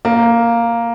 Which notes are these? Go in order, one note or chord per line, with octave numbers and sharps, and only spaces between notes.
A#3